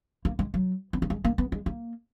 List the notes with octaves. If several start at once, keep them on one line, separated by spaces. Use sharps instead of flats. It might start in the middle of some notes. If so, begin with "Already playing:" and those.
A#3
G#3
F#3
B3
A#3
G#3
A#3
B3
G#3
A#3